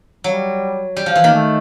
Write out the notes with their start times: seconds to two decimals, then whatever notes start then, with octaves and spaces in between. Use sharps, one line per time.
0.24 F#3 G3
0.97 G3
1.06 F3
1.15 E3
1.24 D#3 A#3
1.33 A3